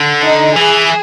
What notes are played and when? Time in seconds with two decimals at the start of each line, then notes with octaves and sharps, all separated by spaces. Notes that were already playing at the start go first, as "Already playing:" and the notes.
Already playing: D3
0.22 D#4
0.55 E3 G#4